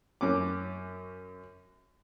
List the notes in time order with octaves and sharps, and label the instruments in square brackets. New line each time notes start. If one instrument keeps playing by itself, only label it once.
[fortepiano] F#2 C#4 D6